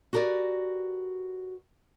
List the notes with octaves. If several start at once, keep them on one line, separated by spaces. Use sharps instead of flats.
F#4 G4 A#4 B4 D5